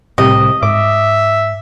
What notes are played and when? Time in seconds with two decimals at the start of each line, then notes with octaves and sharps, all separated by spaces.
0.18 C2 A2 C3 G4 D#5
0.63 G#2 E5 D6